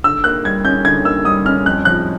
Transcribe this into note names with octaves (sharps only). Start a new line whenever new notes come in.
D3 E6
A#3 F#6
G3 G#6
C#4 G6
D3 G#6
A#3 E6
G3 D#6
C#4 F6
F2 F#6
F3 F#6